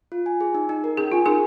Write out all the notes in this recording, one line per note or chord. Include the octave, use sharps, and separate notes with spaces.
F4
G#5
G#4
D#4
D#4
A#4
C#4 G#4
F4 G#5
D#4 G#4 A#4